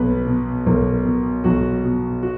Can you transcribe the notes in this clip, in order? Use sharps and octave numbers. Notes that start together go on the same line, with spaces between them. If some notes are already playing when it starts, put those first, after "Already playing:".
Already playing: B1 B2 B4
B2
B1 A#4
B2
B1 F#4
B2
F#4